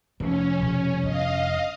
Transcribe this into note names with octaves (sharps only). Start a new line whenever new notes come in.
F1 C3 F3 G#3 C#4
B2 G3
G2 B3 D#5 F5